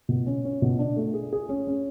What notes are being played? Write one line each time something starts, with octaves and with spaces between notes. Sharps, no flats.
B2
C#4
C#4
B2
D4
A3
G#4
G#4
C#4
C#4